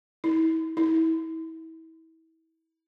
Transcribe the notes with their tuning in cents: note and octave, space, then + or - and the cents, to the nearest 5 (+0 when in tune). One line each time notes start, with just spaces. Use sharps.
E4 -35
E4 -30